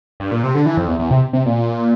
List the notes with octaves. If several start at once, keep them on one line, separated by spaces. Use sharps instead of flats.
G2
A#2
C3
D3
E3
F2
E2
E2
C3
C3
A#2